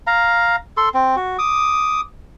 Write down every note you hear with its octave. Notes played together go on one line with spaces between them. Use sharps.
F5 A#5
A4 C6
C4
F#4
D6 D#6